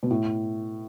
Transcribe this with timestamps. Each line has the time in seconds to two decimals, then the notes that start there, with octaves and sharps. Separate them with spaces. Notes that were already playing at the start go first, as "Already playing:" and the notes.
0.03 B2
0.10 A2